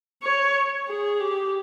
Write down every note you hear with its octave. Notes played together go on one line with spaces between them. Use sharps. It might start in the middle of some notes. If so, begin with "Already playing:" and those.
C#5
G#4
G4